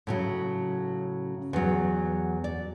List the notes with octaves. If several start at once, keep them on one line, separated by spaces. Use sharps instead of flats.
A2 C#3 F#3
E2 F#3
D5